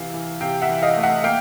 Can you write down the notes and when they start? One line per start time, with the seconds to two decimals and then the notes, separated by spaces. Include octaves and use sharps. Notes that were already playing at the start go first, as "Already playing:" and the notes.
Already playing: C3 E3 F5
0.14 E3
0.41 C3 F5 G5
0.62 E5 F#5
0.69 E3
0.82 D#5 F5
0.96 A3
1.03 E5 F#5
1.24 A#3 F5 G5